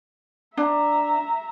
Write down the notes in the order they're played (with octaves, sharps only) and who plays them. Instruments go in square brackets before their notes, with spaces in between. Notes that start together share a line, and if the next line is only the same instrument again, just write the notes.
[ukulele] D4 [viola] E5 A#5